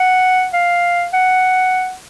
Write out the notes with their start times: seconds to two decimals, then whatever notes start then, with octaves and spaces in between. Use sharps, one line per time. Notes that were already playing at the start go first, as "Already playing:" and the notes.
Already playing: F#5
0.54 F5
1.13 F#5